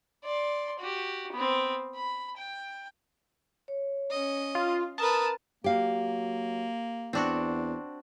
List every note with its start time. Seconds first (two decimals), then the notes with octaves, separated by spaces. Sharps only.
0.24 D5 C6
0.79 F#4 G4
1.32 B3 C4
1.95 B5
2.37 G5
3.68 C#5
4.10 C#4 D#5
4.55 F4
4.98 A#4 B4 A5 D#6
5.64 F#3 A#3 G4 F5
7.13 E2 C4 D4 F#4